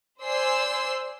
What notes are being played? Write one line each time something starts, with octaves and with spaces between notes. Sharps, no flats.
C5 D5 G#5 C6 E6 C7